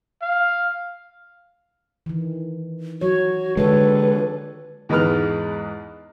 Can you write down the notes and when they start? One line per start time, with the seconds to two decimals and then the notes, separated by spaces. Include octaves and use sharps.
0.22 F5
2.06 D#3 E3
3.01 F#3 F#4 C#5
3.57 D3 G#3 D4 A4 B4 C#5
4.89 E2 G#2 G#3 B4 F6